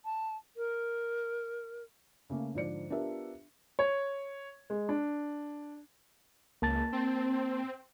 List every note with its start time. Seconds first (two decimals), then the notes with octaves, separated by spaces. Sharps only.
0.05 A5
0.57 A#4
2.30 C#3 A3 A#3
2.55 G#2 D3 F3 D5 C#7
2.90 B3 D4 F4 G4 A#4 E5
3.79 C#5
4.70 G#3
4.89 D4
6.62 C#2 A#3 A5 A6
6.93 C4